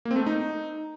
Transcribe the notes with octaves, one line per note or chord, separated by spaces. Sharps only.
A#3
C4
A3
C4
D#4